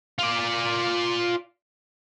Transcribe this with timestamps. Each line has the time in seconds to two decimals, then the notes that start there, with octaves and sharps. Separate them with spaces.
0.19 F4 D5